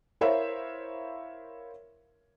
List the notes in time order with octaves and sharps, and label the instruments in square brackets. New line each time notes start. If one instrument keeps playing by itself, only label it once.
[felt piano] E4 A#4 C5 C#5 E5 F5